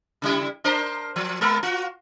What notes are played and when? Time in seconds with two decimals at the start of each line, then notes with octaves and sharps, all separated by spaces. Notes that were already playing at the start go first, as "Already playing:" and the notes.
0.22 C#3 G3 E4
0.64 D4 A#4 C5
1.16 F3
1.41 G#3 B3 A#4
1.63 F4 F#4